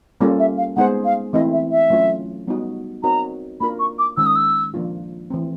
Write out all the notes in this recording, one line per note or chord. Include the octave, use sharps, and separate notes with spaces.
G3 A#3 C#4 F4 A4
E5
F5
G#3 B3 D#4 G#4 C5 F#5
F5
E3 A3 C4 E4 D#5
E5
E5
F#3 A3 C#4 F4
G3 B3 D#4 F#4
C4 D#4 F#4 A#4 C#5 A#5
A#3 D4 F4 A#4 B5
C#6
D6
D#3 G#3 C#4 E6
D#6
E6
F3 A#3 D4 F4
E3 A3 C4